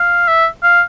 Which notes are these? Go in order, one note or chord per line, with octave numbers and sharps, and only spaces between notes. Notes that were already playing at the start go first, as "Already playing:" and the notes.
Already playing: F5
E5
F5